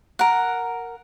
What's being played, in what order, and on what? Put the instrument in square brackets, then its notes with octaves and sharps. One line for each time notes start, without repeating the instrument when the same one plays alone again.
[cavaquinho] A#4 F#5